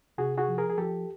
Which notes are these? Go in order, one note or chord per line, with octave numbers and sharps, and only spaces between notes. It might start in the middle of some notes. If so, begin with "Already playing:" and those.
C3 F#4 G#4
F#4 G#4
F3
G#4 A#4
G#4
F3 G4 A4